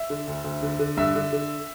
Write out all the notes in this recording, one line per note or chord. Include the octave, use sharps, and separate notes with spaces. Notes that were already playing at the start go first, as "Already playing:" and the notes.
Already playing: E5
D3
D2
D2
D3
D3
G2 E5
D3
D3